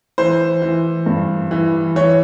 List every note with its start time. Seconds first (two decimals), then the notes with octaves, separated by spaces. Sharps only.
0.18 E3 C5
0.62 E3
1.06 G2
1.51 E3
1.96 E3 C#5